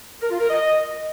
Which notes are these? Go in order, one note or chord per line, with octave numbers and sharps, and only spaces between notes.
A#4
F4
A#4
D#5